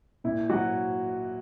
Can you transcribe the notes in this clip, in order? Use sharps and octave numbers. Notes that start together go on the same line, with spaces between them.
A#2 E4
F#3 F#4